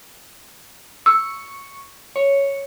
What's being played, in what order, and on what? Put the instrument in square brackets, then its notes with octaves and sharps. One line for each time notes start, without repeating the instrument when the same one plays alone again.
[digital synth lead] C#6 [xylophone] E6
[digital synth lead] C#5